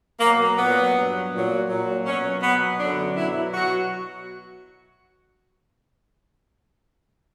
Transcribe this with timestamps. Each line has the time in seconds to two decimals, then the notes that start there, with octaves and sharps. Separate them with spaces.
0.20 B2 F#3 A#3
0.58 A#2 F#3 B3
0.94 G2 F#3
1.32 A#2 F#3
1.68 A#2 F#3
2.06 B2 F#3 C#4
2.42 B2 F#3 B3
2.79 F#2 D3 F#3 D4
3.16 B2 F#3 E4
3.53 B2 F#3 F#4